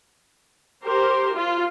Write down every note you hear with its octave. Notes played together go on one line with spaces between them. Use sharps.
G4 A#4 C5
F4